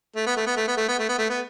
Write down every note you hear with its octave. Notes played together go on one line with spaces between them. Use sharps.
A3
B3
A3
B3
A3
B3
A3
B3
A3
B3
A3
B3